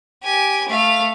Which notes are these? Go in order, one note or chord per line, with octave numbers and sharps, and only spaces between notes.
G4 G#5
A3 F5